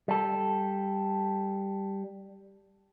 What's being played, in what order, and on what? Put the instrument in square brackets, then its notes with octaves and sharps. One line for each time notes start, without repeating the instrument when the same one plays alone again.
[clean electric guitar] G3 A4